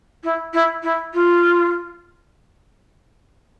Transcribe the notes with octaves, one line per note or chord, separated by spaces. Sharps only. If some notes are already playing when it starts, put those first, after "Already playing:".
E4
E4
E4
F4